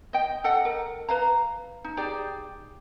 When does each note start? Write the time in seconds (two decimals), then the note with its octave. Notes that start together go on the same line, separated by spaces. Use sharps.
0.13 D#5 G5
0.44 A4 D#5 F#5 G5
0.65 A#4
1.09 B4 F5 A#5
1.84 D#4
1.97 D#4 G4 G#4 D5